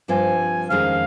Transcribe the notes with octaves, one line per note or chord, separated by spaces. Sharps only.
G2 F3 C4 F4 G#5
F2 D#3 G#3 C#4 G#4 F5